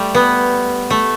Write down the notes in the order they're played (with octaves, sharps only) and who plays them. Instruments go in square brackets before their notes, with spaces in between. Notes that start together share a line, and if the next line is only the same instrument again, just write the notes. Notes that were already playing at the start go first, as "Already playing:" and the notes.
Already playing: [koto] G3 A3
B3
A3